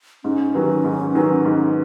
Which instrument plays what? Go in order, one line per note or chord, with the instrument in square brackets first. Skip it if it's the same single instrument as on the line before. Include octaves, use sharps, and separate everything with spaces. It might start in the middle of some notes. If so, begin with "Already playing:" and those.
[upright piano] G#2 [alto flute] C#4
[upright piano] D#3 F#3 B3
G#2
D#3 F#3 B3
G#2